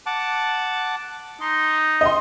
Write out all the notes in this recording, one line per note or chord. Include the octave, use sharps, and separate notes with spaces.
F#5 A5 D6
D#4 C6
C4 D#5 C6